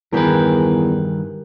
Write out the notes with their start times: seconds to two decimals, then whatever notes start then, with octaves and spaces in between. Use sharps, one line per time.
0.13 E2 G2 D#3 G4 G#4 A#4 B4